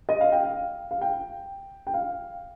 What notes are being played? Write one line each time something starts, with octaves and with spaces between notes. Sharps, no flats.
D#5
F5
G5
F5
F5
G5
G5
F5